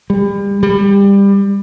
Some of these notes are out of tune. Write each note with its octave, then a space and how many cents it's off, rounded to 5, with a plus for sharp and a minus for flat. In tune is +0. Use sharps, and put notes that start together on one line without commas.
G3 +35
G3 +20